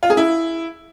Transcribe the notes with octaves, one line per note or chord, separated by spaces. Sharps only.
F4
G#4
E4